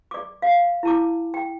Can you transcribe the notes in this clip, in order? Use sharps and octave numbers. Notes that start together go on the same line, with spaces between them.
D5 D6
F5
E4 A5 D6
G5